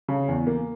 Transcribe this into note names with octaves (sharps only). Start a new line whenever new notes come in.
C#3
E2
A#3